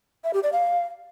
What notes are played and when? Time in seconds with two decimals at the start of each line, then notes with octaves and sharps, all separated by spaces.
0.24 E5
0.34 G4
0.43 D5
0.53 F5